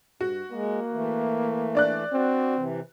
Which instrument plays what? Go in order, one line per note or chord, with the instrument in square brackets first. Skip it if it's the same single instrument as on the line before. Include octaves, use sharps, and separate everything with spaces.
[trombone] G2 [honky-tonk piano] F#4
[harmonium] G#3 [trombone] A#3
[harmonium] E3 A3
[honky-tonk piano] D4 D5 F#6
[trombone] C4 [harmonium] F#4
[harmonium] C3 E3